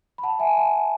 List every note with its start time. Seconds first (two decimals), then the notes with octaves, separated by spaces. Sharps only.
0.18 B5
0.23 F#5 A5
0.39 E5 G#5
0.57 F#5 A5